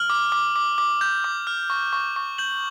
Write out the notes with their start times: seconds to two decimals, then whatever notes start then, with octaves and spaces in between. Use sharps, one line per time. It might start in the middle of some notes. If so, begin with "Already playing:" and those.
Already playing: F6 F#7
0.10 D6
0.32 D6
0.56 D6
0.78 D6
1.01 G6
1.24 D6
1.47 F6
1.70 C#6
1.93 C#6
2.16 C#6
2.38 G6 F#7